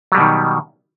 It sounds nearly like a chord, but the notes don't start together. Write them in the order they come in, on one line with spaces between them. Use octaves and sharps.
F#3 G3 B2 D#3